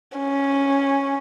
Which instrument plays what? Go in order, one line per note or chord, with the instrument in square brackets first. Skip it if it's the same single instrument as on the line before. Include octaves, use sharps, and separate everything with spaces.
[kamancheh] C#4